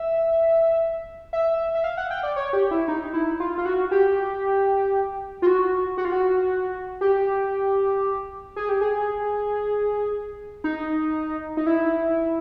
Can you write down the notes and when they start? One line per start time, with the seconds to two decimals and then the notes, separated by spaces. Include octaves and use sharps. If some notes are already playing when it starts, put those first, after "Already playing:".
Already playing: E5
1.33 E5
1.75 E5
1.84 F5
1.97 F#5
2.11 G5
2.23 D5
2.36 C#5
2.53 G4
2.71 E4
2.88 D#4
3.13 E4
3.40 F4
3.58 F4
3.66 F#4
3.91 G4
5.42 F4
5.47 F#4
5.98 F#4
6.05 F4
6.12 F#4
7.01 G4
8.56 G#4
8.69 G4
8.81 G#4
10.64 D#4
11.57 D#4
11.67 E4